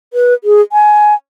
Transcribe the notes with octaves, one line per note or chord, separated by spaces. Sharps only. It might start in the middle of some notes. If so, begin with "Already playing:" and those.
B4
G#4
G#5